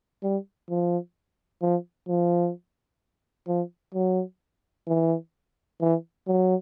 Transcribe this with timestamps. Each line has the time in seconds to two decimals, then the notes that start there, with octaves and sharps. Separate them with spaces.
0.23 G3
0.70 F3
1.62 F3
2.08 F3
3.48 F3
3.95 F#3
4.87 E3
5.81 E3
6.27 F#3